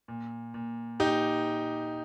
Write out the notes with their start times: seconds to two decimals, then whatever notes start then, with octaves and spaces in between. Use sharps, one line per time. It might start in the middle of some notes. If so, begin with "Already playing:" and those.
0.08 A#2
0.54 A#2
1.00 A#2 D#4 G4